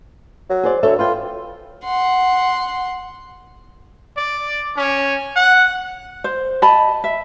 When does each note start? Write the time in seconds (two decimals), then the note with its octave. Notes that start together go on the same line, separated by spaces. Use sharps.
0.50 F#3
0.63 G#4 C5 D5
0.83 D2 A4 C#5 E5
0.99 F4 B4 G5
1.84 F#5 C6
4.16 D5
4.76 C#4
5.36 F#5
6.24 C5
6.62 D#5 A5 B5
7.04 E5